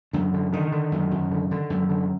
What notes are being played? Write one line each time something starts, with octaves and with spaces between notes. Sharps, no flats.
F#2 D3
D3
D3 D#3
D3
F#2
F#2
D3
D3
F#2
D3